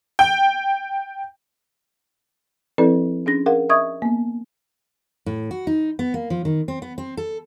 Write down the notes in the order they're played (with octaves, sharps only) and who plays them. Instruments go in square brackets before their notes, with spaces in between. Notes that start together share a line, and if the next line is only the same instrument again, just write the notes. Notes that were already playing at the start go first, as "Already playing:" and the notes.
[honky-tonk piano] G5
[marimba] F3 C4 E4 A4 B4 D5
C#4 D4 G#4 A#6
G#4 A#4 F5 F#5
D#5 E5 C#6 D#6 G#6
A#3 B3
[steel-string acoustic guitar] A2
F#4
D#4
B3
A#3
F3
D#3
C4
B3
C4
A4